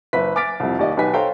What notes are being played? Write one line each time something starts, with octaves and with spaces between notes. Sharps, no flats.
F#1 B4 E5 B6
G#5 D6 F6 A6 B6 D7
C2 F2 C3
D#2 G4 D5 D#5
B1 D#4 G4 B4 G#5 B6
A4 C5 C#5 F5 G5 A#5